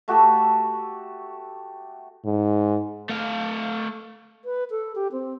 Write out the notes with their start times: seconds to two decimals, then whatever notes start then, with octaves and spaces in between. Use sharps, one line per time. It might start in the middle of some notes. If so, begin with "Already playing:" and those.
0.08 A3 F#4 G4 A4
2.25 G#2
3.09 A3 F5
4.45 B4
4.71 A4
4.95 G4
5.12 C4